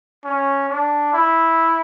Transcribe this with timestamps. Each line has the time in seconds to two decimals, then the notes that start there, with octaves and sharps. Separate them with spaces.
0.24 C#4
0.69 D4
1.13 E4